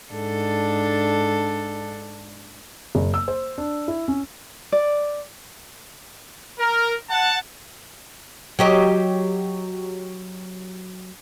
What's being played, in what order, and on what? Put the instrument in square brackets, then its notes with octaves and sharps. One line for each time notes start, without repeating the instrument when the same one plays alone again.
[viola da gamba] G#2 D4 A4
[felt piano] F#1
E6
C5
D4
E4
C#4
[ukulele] D5
[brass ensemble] A#4
F#5 A5
[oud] F#3 G4 D#5